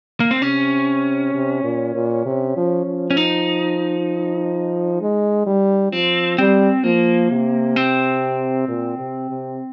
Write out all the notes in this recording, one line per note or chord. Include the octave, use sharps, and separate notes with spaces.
A#3
C4
C3 C#4
C3
A#2
A#2
C3
F3
F3
C#4
D#4
G#3
G3
F3 C4
G3 C4
F3 A#3
C3
C4
A#2
C3
C3